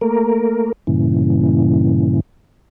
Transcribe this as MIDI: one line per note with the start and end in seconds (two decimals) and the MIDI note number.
0.01 0.72 57
0.01 0.72 58
0.01 0.72 70
0.87 2.20 43
0.87 2.20 46
0.87 2.20 49
0.87 2.20 52